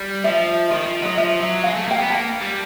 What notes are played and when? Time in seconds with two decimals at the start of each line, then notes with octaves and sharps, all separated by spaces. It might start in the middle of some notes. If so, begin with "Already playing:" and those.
Already playing: G3
0.24 F3 E5
0.71 D#3 D#5
0.87 F3
1.02 F#3 D#5
1.18 F3 E5
1.41 F#3
1.64 G#3 F5
1.76 A3
1.88 A#3 G5
1.99 B3 G#5
2.10 A#3 A5
2.41 G3